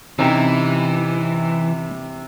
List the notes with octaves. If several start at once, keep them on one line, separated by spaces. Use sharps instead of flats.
C3 E3 C#4 D#4 G4